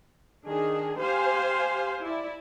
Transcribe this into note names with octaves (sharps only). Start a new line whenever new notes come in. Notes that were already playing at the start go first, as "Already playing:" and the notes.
D#3 D4 G#4
G4 C5 F5 G#5
E4 D5